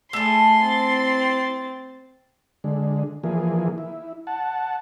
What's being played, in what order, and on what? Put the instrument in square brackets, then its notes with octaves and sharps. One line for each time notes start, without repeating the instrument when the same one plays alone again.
[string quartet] A3 G#4 [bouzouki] E4 A5 [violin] C6
[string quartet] C4 A6
[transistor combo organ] D3 G#3
E3 F3 A#3 G#4
E4
F#5 A5